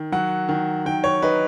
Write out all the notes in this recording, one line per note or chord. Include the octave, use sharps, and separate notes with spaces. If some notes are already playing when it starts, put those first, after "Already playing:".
Already playing: D#3
F#3 F#5
D#3
D#3 G5
C#5
D#4 B4